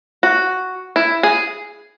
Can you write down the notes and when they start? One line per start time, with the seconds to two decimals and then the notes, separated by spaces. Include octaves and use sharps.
0.23 F#4
0.96 E4
1.23 G#4